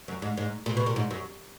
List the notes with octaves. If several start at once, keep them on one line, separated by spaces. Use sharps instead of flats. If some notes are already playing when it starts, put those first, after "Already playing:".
F#2
G#2
G#2
A#2
B2
A#2
G#2
F#2